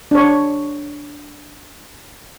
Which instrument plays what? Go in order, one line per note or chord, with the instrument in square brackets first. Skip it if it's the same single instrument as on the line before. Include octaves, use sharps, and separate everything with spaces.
[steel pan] D4 C#5